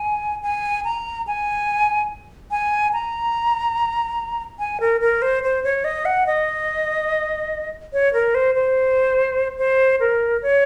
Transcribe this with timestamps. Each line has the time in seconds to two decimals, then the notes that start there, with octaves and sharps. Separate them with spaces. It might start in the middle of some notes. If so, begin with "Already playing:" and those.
Already playing: G#5
0.43 G#5
0.85 A#5
1.27 G#5
2.51 G#5
2.93 A#5
4.59 G#5
4.80 A#4
5.01 A#4
5.22 C5
5.43 C5
5.64 C#5
5.84 D#5
6.05 F#5
6.27 D#5
7.93 C#5
8.13 A#4
8.35 C5
8.55 C5
9.58 C5
10.00 A#4
10.42 C#5